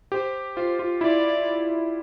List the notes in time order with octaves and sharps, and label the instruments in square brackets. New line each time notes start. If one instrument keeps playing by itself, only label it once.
[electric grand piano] G4 [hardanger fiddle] C5
[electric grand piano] F4 [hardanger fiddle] C5
[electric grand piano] F4
[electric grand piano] E4 [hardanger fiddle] D5